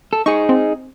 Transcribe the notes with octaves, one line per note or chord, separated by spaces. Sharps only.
A4
D#4 G#4 C#6
C4